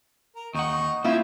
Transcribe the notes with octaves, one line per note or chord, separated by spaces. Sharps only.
A#4
D#2 D#4 D#5 F#5 C#6
F3 A#3 C4 E4 F4 C#5 E5